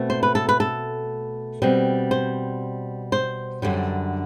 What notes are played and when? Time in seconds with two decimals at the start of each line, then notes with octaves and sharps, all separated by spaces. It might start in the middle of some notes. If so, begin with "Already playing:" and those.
Already playing: B2 A3 C4
0.10 C5
0.23 B4
0.35 A4
0.49 B4
0.60 A4
1.62 B2 G3 C4
2.11 C5
3.12 C5
3.62 F#2 D3 G3